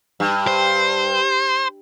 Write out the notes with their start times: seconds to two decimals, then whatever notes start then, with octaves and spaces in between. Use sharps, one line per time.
0.20 G2
0.47 C5